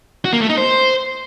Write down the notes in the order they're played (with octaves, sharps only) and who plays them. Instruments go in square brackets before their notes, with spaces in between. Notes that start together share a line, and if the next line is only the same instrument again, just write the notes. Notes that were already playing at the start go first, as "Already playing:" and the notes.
[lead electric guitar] F#4
A#3
A3
D#4
C5